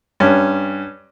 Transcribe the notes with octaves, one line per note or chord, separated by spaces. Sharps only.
G2 C#4